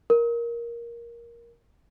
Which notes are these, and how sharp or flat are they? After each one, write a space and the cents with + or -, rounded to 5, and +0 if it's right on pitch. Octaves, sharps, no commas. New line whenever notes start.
A#4 +10